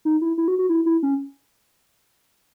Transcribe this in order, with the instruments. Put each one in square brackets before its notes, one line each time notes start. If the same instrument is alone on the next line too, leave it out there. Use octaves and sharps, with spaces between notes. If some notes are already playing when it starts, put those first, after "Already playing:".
[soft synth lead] D#4
E4
E4
F#4
F#4
E4
E4
C#4